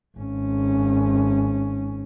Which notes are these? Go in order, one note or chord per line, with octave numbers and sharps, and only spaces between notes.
G#1 C#4